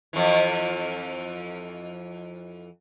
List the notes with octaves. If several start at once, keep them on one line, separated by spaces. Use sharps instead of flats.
F2 E3